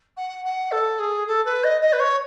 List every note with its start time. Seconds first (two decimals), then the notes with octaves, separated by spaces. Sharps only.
0.16 F#5
0.45 F#5
0.71 A4
0.99 G#4
1.27 A4
1.45 B4
1.63 D#5
1.81 D#5
1.92 B4
1.99 C#5